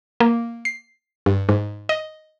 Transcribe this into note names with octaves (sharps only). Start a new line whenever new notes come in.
A#3
C7
G2
G#2
D#5